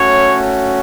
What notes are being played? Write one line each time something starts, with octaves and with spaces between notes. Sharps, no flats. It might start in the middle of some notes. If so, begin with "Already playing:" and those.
Already playing: A3 C#4 F#4 C#5